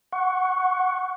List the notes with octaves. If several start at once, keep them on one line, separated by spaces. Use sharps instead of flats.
F#5 C#6